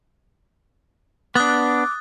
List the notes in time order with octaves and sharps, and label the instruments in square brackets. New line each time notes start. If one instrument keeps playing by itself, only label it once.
[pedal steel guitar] B3 D4 [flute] D6 [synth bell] D#6 F#6 A6